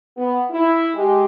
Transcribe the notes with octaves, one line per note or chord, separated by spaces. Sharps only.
B3
E4
G#3 G4